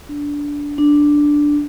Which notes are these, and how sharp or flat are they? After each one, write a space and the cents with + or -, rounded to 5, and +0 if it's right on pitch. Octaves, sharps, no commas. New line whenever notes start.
D4 -15
D4 +0